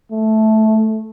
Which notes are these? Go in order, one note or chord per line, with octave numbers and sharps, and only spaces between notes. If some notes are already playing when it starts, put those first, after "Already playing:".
A3